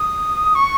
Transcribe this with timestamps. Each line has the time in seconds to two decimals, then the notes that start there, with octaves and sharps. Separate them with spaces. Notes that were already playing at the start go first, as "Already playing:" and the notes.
Already playing: D#6
0.55 C#6